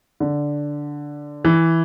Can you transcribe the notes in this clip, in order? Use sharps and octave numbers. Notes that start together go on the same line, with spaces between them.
D3
E3